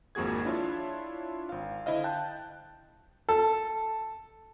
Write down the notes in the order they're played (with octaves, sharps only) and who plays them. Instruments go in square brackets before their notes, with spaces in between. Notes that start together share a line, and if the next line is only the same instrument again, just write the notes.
[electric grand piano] G#1 F2 A#3 F#4 G#4 G#6
D4 E4 F4 C#5
G#1 F5
D3 E4 C5 D#5 F5
G5 A5 F#6 G6
[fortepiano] A4